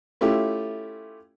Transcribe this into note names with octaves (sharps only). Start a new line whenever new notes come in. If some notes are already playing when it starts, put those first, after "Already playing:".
A3 C#4 E4 F4 G4